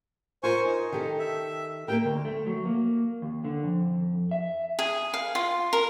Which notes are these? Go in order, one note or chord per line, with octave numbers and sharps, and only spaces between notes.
F4 A#4 C5 G#5 C#6
D#4
D#3 G4 A4
E5
A#3 G4 A#4 G5
D2
A3
F#3
A#3
D#2
D3
F2
E5
G#4
F5
F4
A#4